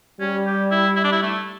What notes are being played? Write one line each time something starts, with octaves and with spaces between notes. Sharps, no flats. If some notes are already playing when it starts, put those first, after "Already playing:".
G3 C#4
G4
E4
E4
D4
E4
A3